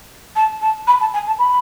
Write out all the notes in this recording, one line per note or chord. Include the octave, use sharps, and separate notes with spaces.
A5
A5
B5
A5
G#5
A5
B5